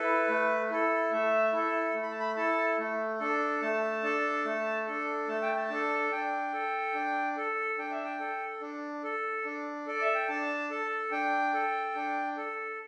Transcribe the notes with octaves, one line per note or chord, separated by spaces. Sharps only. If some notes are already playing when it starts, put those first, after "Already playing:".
Already playing: E4 A4 B4
A3
E4 A4
A3 E5
E4 A4
A3
B5
A5
B5
E4 A4 A5
A3
D4 A4
A3 A5
D4 A4
A3
D4 A4
A3 A5
G5
A5
D4 A4
D4 G5
A4
D4
A4
D4 G5
E5
G5
A4
D4
A4
D4
A4 D5
E5
G5
D4 A5
A4
D4 G5
A4
D4
A4